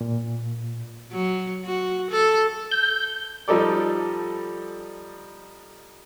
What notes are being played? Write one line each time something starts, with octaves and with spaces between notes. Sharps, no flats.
A#2
F#3
F#4
A4
G6
F3 G3 D#4 A4 D5